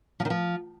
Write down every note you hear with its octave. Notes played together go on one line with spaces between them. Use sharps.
F3
D#3
F3